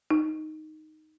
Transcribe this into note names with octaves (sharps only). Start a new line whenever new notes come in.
D#4